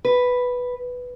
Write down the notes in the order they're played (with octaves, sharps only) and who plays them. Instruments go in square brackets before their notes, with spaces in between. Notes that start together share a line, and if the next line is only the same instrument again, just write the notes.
[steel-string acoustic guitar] B4